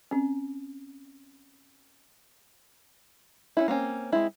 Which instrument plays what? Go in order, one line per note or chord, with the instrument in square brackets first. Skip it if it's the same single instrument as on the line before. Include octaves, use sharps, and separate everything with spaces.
[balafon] C4 C#4
[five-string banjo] C#4 D#4 E4
A#3 C4 C#4
G#3 C4 E4